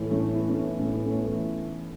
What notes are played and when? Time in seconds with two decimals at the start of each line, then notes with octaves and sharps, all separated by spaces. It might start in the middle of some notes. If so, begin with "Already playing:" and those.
Already playing: A2 E3
0.10 A3 C#4
0.34 B3 E4
0.48 A3 C#4
0.79 A2 C#4
0.93 B3
1.05 A3 C#4
1.25 E3 A3